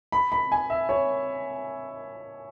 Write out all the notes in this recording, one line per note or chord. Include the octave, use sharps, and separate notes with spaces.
B5
B5
G#5
E5
C#5